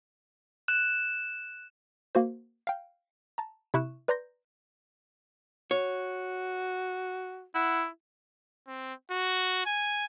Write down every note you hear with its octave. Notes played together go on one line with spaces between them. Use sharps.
F#6 E7
A#3 F#4 C5
F5 G5
A5 A#5
C3 E4 E5 C#6 F#6 E7
B4 D5 A#5 C6 G6 A#6
F#4 C#5
E4 F#5
C4
F#4
G#5